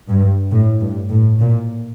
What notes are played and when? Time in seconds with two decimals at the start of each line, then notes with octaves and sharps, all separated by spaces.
0.08 G2
0.51 A2
0.81 G2
1.10 A2
1.39 A#2